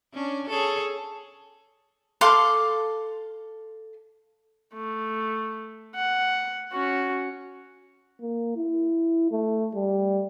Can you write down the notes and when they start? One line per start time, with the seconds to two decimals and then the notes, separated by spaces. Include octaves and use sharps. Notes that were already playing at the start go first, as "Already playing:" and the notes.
0.14 C#4 D4
0.49 G#4 A4 C#5
2.21 A4 F5 C6 D6
4.74 A3
5.95 F#5
6.72 C#4 F#4
8.21 A#3
8.57 E4
9.31 A3
9.75 G3